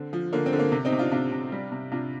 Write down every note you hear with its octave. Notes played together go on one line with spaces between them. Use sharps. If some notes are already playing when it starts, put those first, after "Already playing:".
Already playing: D3 C4
F3
D3 A#3
C4
D3
A#3
C3
C4 D#4
C3
D4 F4
C3 D4 F4
C3
G3
C3
C3 D4 F4